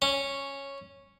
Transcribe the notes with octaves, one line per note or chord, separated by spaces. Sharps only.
C#4